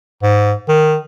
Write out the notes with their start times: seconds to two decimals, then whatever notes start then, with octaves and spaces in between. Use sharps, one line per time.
0.23 G#2
0.68 D#3